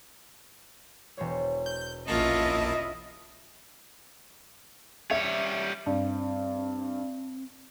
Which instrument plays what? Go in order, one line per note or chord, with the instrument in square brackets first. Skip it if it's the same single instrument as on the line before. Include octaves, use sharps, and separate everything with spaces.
[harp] E1 C5 C#5
[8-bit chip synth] G6
[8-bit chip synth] A#1 A#3 A5 [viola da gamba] C#4 F4 [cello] E4 D#5
[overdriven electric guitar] G3 C#5 [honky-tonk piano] E5
[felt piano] G2 [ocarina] C4